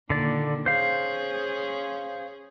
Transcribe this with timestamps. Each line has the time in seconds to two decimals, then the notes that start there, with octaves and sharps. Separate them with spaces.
0.10 A#2 D3 D#3 D5
0.66 C#4 G#4 C5 F5